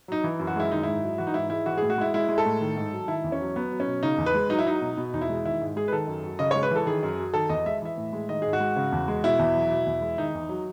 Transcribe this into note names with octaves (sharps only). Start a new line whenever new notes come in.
F#3 D#4
E3
F#2
F#4
G#3 E4
D#3 D#4
G#2 E4
F#3
E3 F#4
D#4
G#2 E4
G#3 E4
E3 F#4
A2 G#4
F#4
G#3 E4
G#3 E4
G#3
A4
A2
D#3
G#2
F#3
D#3 E4
E2
C#4
F#3
F#3 B3
F#3
C#4
B2
C#3 D#4
E2
B4
G#3
F#3 D#4
E4
F#3 D#4
B2
B2
E2 D#4
E4
G#3
D#3 E4
G#2
G#3 G#4
B4
D#3 A4
F#2
F#3
C#3 D#5
G#3 C#5
B4
E3 A4
D#3 G#4
F#2
F#3
D#3 A4
E2 D#5
G#3 E5
E3 E5
A2
G#3
D#3 D#5
G#2 G#4
F#4
G#3
C#3
E2
G#3
B2 E4
E2
F#3
B2
E2
G#3
D#3 D#4
E2
F#3